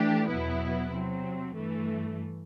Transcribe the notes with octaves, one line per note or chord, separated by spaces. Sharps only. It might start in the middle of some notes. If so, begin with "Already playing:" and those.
Already playing: E3 A3 D4 G4
E2 B2 F#3 B3 E4
C3 F#3 C4
G2 E3 A3